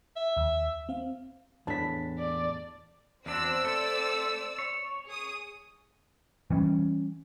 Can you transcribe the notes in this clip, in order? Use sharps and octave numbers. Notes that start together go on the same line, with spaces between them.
E5
D#2 E6
C4 F5
E2 A2 D4 A5 B6
D5
E2 C4 D4 F#4 D5 E6
A3 A4
C#5
G#4 D#6
E3 G3 C#4